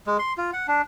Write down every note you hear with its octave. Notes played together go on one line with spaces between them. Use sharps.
G#3
C6
F4
F#5
D4